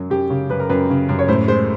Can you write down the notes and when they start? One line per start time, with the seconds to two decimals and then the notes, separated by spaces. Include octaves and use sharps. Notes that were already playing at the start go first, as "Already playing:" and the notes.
Already playing: F#2 F#3
0.10 F#2 G4
0.30 C#3
0.50 F#2 B4
0.60 A#4
0.69 F#2 B4
0.90 C#3
1.09 F#2
1.19 C#5
1.28 A2 C5
1.48 G#3 C5